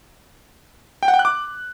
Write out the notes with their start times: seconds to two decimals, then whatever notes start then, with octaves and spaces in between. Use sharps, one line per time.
1.03 G5
1.08 F#5
1.14 G5
1.19 F#6
1.25 D6